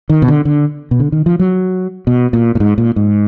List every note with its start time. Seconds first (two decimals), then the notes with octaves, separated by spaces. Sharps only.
0.10 D#3
0.22 B2
0.28 D3
0.45 D3
0.91 B2
1.00 D3
1.12 D#3
1.26 F3
1.39 F#3
2.07 B2
2.33 A#2
2.55 A#2
2.60 G#2
2.78 A#2
2.96 G#2